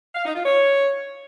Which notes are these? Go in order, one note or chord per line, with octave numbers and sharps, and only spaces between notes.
F5
D#4
F4
C#5